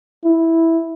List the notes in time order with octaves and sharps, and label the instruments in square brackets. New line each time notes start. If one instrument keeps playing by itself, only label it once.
[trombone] E4